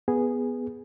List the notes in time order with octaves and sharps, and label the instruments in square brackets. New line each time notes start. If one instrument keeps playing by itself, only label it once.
[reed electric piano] B3 G#4